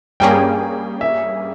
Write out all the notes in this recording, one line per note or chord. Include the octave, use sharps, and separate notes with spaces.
G2 G3 A#3 C#4 G#4 G5
E5